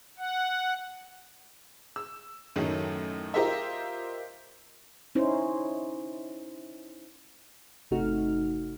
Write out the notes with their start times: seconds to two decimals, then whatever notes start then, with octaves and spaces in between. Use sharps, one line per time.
0.18 F#5
1.96 E6
2.56 F#2 A2 D#3 F#3 A3
3.34 F4 G4 A#4 C5 D#5 E5
5.15 C#4 D#4 E4 C5
7.91 G1 C3 A3 D#4 F#4 F6